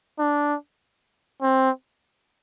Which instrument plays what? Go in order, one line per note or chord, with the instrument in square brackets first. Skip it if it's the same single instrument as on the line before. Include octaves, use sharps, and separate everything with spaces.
[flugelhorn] D4
C4